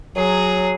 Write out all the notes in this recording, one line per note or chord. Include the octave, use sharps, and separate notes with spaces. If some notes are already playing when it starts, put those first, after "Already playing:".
F#3 G#4